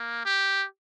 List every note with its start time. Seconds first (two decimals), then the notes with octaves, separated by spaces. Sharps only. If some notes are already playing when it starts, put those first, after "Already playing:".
Already playing: A#3
0.25 G4